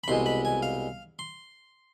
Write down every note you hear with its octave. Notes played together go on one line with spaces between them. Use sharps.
B5
C2 B2 G#3 C6
B5
G#5
F5
C6